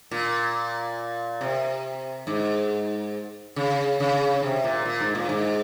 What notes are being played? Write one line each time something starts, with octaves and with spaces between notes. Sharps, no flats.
A#2
C3
G#2
C#3
C#3
C3
A#2
A#2
G#2
A#2
G#2